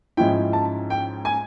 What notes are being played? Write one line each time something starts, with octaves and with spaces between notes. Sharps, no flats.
G#2 F3 G#3 C#4 E4 G5
A5
G5
G#5